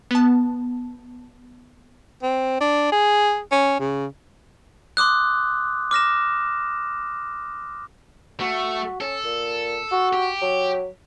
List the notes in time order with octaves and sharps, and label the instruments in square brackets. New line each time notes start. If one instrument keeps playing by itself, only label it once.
[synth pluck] B3 A5
[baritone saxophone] C4
D4
G#4
C#4
C#3
[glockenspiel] C6 D6 D#6 F#6
D6 F6 A#6 E7
[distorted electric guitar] A3 [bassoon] F#4
[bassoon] C#4 [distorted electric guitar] A4
[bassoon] A#2
F#4
[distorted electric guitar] G4
[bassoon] F#3